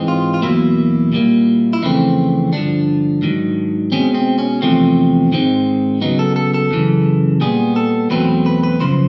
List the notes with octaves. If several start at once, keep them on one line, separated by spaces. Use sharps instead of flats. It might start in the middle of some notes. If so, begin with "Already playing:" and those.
Already playing: G#2 E3 G#3 C4
F4
F4
E2 B2 F#3 A#3 E4
A#2 G3 A#3
E4
F2 C#3 E3 A3 C4 D#4
G2 D3 F3 D4
G#2 D#3 F#3
B2 G#3 C4 C#4
C4
C#4
E2 C3 F3 A3 C4
G#2 D#3 G#3 C4
C#3 F#3 B3 D#4
A4
A4
A4
F#2 C#3 E3
A#2 G3 B3 G#4
A4
E2 B2 F#3 A3 C4 B4
B4
B4
F#2 C#3 F3 C5